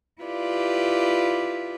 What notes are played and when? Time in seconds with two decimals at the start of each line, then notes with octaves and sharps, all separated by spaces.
0.24 E4 F4 G4 B4 D5